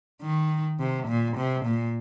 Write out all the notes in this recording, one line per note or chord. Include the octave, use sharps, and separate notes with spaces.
D#3
C3
A#2
C3
A#2